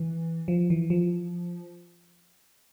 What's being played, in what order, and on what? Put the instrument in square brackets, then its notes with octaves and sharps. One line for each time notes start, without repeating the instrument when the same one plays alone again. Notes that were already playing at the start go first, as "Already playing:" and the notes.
Already playing: [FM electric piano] E3
F3
E3
F3